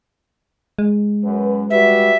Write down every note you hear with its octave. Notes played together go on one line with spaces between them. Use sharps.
G#3
F#2 B4
G3 F#4 B4 E5